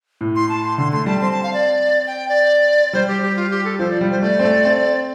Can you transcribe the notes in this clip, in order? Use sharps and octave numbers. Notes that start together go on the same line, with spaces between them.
A2
C6
A5
C6
D3 C6
A3 C6
G3 A5
C4 C6
A5
F5
D5
G5
D5
G3 C5
G4
G4
F4
G4
A4
F3 C5
D5
G3
C5
A3 D5
C4
A3
C4